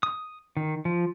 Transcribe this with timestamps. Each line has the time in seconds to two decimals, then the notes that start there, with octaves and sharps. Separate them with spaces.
0.03 D#6
0.57 D#3
0.85 F3